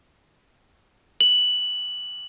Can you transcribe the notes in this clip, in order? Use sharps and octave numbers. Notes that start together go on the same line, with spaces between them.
F#7